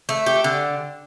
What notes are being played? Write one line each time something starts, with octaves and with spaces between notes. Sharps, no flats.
A3
G4
D3